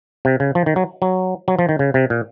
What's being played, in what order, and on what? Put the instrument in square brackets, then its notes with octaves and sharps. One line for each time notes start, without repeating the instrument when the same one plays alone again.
[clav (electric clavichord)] C3
C#3
F3
D#3
F#3
F#3
F#3
F3
D#3
C#3
C3
A#2